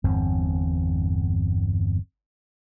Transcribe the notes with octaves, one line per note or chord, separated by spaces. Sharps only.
G1 E2 G2 C4